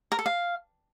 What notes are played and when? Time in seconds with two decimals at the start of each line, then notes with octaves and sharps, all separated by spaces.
0.12 A#4
0.19 A4
0.26 F5